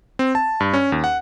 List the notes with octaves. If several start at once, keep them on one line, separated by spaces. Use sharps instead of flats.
C4
A5
G2
C#4
D#2
F#5